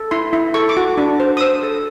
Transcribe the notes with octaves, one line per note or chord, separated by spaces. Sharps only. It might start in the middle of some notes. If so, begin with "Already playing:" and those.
Already playing: A4
E4 C6
E4
A4 C#6
D6
F#4
D4
C5
D#6
C5 E6
A4